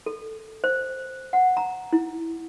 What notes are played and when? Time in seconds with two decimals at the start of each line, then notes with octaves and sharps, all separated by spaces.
0.06 A4
0.64 C5
1.33 F#5
1.57 A#5
1.93 E4